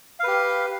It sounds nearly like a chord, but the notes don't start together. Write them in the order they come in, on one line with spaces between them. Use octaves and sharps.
F5 B4 G4